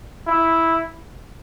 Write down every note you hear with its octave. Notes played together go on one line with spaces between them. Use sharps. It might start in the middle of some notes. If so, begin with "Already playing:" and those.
E4